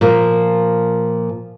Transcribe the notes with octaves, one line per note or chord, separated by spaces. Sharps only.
A#2 F3 A#3